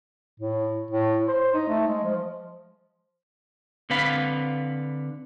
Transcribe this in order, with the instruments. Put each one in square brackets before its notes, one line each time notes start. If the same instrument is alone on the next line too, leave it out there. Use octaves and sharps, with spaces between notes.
[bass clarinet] A2
A2
C5
D#4
A3
G#3
F3
[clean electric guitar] D3 C4 B4 F5 B5